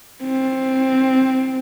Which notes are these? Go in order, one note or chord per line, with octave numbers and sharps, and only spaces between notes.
C4